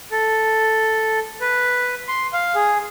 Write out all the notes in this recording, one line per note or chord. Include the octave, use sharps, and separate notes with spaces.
A4
B4
C6
F5
G#4